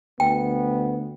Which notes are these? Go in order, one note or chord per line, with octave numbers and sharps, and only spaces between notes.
D2 B3 G5